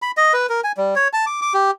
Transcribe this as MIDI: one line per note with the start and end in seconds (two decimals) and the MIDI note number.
0.02 0.11 83
0.17 0.33 75
0.33 0.46 71
0.49 0.61 70
0.64 0.72 80
0.77 0.95 55
0.96 1.08 73
1.13 1.25 81
1.26 1.41 86
1.42 1.53 86
1.54 1.71 67